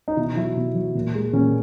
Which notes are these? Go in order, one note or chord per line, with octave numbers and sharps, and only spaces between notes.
D#4
B2 E4
F#3 E4
B2
F#3
A#2
G#3
A#2 C#4